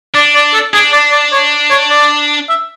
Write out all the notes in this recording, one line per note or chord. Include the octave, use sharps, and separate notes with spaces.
D4 D5
D5
A4
D4 G#4
D5
D5
C#5
C#5
D5
E5